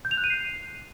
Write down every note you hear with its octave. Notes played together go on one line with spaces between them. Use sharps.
G6
F7
F#6
D#7
C7